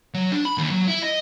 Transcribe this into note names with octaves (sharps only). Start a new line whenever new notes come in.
F#3
D4
B5
D#2
F#3
E4
D#5